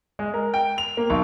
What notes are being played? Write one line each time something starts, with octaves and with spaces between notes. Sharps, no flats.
G#3
A#4
G5
F7
A#3
B1